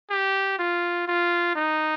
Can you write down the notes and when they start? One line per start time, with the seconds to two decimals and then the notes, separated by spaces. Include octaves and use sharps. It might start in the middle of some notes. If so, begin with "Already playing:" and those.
0.10 G4
0.59 F4
1.07 F4
1.55 D#4